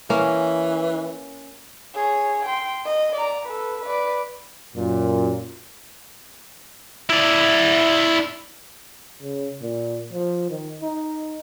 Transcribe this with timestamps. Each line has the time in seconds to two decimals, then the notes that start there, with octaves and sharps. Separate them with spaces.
0.10 E3 A#3 C#4
1.95 G#4 C#5
2.45 G5 C6
2.85 D#5
3.15 D5 A#5
3.46 A4 B4
3.82 B4 D5
4.75 F#2 A#2
7.10 E4 D5
9.22 C#3
9.62 A#2
10.13 F3
10.50 D#3
10.82 D#4